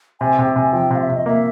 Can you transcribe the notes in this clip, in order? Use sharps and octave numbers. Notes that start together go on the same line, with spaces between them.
C3 G#5
C3 G5
C3 G#5
F3 G5
C3 F5
E5
C3
D#5
A#3 E5